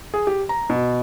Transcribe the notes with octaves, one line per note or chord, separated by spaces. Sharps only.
G#4
G4
A#5
B2